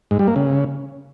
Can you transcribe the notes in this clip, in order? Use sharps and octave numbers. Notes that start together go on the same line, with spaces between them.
G#2
G3
A#3
C#3